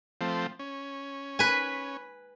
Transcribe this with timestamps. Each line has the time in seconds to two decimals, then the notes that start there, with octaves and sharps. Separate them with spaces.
0.21 F3 A3 C4
0.59 C#4
1.39 B4 G#5